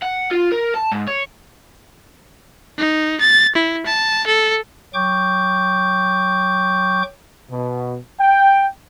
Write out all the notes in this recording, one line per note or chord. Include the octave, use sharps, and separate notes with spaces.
F#5
F4
A#4
A5
G#2
C#5
D#4
A6
E4
A5
A4
F#3 G5 C#6 D6 G6
B2
G5